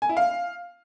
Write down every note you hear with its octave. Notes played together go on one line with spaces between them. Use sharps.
G#5
E4
F5